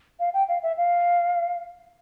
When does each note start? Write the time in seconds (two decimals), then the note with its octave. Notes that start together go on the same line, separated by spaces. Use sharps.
0.20 F5
0.34 G5
0.49 F5
0.63 E5
0.77 F5